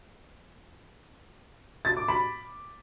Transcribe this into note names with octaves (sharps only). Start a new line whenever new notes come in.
A6
D6
B5